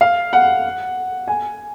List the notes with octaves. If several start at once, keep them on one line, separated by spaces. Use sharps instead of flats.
F5
F#5
G#5